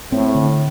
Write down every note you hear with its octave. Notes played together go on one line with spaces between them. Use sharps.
A2 C4
D3